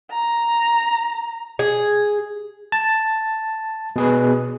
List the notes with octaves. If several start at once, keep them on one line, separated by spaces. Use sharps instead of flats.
A#5
G#4
A5
B2 G#4 B4